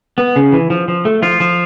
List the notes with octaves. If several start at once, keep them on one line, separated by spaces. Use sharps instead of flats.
B3
C#3
E3
F3
F3
A3
F3 F4
F3